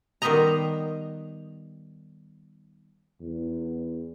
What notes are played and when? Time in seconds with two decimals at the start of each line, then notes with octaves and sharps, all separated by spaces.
0.22 D#3 G3 B3 C5 D#5 A#5
3.21 E2